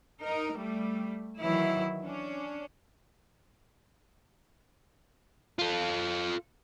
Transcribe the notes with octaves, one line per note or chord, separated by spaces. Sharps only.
D#4 A#4
G3 A3
D#3 E3 F#3 E4
C#4 D4
F4 A4